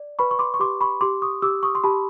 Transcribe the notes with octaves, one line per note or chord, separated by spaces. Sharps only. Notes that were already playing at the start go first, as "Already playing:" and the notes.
Already playing: D5
B4 B5 C#6
C#6
C6 D6
C#6
G4 C6 D6
B5 C#6
G4 C6 D6
C#6 D#6
G4 D6 E6
C#6 D#6
C6
G4 A5 B5